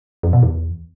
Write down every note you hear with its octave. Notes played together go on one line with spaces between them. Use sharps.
F2
B2
E2